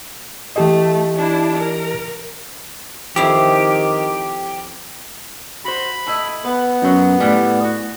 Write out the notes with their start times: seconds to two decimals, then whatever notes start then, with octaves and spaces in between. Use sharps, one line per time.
0.56 E3 A3 G4 D#5
1.16 D4 E4
1.56 A#4
3.16 F2 D#3 E4 G4 F5
5.65 F#4 C5 B5
6.06 A2 E4 D#5
6.45 B3 B4
6.82 F#2 F#3 D#4
7.20 A2 E3 G3
7.64 F#4